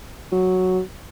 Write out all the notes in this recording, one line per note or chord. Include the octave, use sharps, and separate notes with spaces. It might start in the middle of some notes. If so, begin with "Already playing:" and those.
F#3